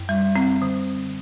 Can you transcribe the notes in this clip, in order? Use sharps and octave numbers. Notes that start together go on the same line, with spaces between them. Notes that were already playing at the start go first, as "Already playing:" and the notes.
Already playing: F#2
G3
C4
D3